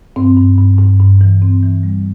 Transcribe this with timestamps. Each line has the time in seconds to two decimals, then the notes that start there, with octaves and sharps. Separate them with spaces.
0.16 G2 C4
0.37 G2
0.58 G2
0.79 G2
1.00 G2
1.21 E3
1.42 G2 C4
1.63 E3
1.83 G3